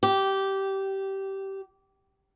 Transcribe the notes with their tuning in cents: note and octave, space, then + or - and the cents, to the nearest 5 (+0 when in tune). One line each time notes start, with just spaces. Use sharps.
G4 -15